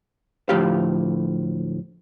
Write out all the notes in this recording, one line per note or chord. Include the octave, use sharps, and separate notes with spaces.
D2 A2 F3 G4 F5